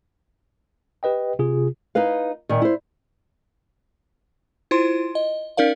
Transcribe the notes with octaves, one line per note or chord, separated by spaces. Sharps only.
G4 B4 D#5 G5
C3 F4 G#4
D#4 E4 B4 F5
A#2 D#3
E4 C5
E4 F4 C5 C6
D#5
C#4 D#4 A#4 D5 F5